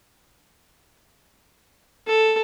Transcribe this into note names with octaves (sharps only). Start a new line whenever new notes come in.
A4